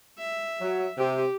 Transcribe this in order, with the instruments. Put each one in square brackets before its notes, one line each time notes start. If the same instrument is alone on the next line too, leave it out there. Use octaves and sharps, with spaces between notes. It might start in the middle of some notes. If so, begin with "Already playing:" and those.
[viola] E5
[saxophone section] F#3
[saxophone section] C3 [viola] G4